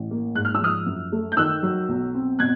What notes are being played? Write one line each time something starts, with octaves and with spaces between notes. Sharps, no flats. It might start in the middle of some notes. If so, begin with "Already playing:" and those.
Already playing: A1
A#3
G#2 F#6
F6
E6
F3 D#6 F6
F#2
A3
G6
D#3 E6 F#6
F#3
B1
C4
B2 F#6 G#6